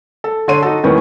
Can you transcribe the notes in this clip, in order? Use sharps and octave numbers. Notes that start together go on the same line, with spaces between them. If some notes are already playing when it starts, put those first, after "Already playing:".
A4
D3 A4 C#5 C6 D#7
D#4 F#4 A4
E2 A2 D#3 G#3 B3 C#4